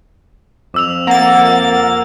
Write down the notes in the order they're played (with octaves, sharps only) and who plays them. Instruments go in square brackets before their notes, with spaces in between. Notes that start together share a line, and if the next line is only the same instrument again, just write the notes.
[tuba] F2 [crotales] D6 E6 F7
[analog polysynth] A#3 A6 [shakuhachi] F#5